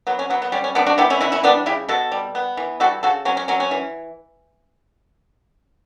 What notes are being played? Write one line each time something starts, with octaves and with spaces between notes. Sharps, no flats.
F#3 B3
C#4
F#3 B3
B3
G3 C#4
C#4
G3 B3 D4
D4 F#4
B3 E4 G4
C#4 E4
E3 C#4 E4
C#4 E4
G3 B3 D4
C#3 E4 G4
B2 F#4 A4
G3
B3
E3
G3 F#4 A4
C#3 F#4 A4
F#3 C#4
C#4
F#3 C#4
C#4
E3